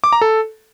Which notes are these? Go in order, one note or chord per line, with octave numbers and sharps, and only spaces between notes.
D6
A#5
A4